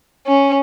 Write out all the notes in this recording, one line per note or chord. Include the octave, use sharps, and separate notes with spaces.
C#4